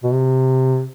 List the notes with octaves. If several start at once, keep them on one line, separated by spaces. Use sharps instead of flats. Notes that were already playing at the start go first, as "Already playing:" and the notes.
B2
C3